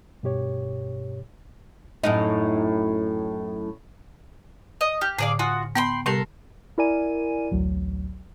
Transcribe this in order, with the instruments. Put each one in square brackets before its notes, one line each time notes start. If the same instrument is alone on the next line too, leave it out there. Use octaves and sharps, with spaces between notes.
[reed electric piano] G2 B2 G4 C#5
[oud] F#2 A2 D#4
[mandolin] D#5
[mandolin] G4 [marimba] F6
[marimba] A2 D3 [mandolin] G#4 D5 F5
[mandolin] F4 F#4 D#6 [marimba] G#5
[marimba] B3 [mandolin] G5 B5 C6
[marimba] C3 G3 G4 [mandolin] A4 A#4 C6
[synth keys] E4 A#4 D5 G#5 D#7
A1 D2 F#3